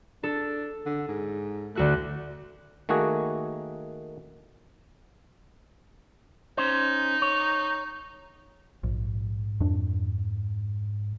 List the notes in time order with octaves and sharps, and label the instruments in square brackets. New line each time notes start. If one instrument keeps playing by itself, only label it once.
[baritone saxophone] D4 [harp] A4
[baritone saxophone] D3
G#2
[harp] D2 F#4 F#6 [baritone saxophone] A3
[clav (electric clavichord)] D#3 A3 A#3 F#4 G#4
[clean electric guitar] C#4 C5 [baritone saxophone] D#4
[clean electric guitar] C#5
[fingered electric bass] A#1 [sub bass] G#2
[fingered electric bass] F2 D4